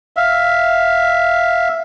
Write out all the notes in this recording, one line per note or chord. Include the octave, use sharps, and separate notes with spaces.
E5 F5